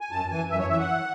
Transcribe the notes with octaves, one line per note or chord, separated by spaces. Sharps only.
G#5
F#2 A5
E3 G#5
F#2 E5
C#5
E3 E5
F#5